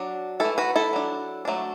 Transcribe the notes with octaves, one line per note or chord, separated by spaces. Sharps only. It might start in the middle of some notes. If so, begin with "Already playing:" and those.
Already playing: F#3 D4
E3 A3 D4 E4 A4
F#4 B4
E4 A4
F#3 D4
F#3 A3 D4